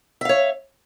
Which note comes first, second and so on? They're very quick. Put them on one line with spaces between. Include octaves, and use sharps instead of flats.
E5 F5 C#5